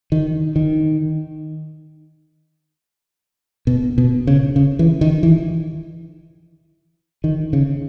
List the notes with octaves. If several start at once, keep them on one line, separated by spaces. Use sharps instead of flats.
D#3
D#3
B2
B2
C#3
C#3
E3
D#3
E3
D#3
C#3